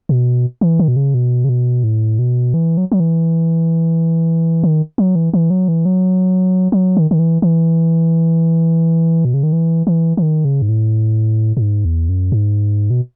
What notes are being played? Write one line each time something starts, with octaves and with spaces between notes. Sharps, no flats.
B2
E3
D#3
B2
C#3
B2
C#3
B2
A2
B2
E3
F#3
F#3
E3
D#3
F#3
E3
E3
F#3
E3
F#3
F#3
D#3
D#3
E3
E3
B2
C#3
D#3
E3
E3
E3
D#3
C#3
G#2
A2
A2
G#2
E2
F#2
G#2
B2